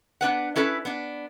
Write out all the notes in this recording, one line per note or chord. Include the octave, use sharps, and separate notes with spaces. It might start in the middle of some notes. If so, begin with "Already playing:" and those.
B3 D4 B4 F#5
C#4 E4 A4 B4
B3 D4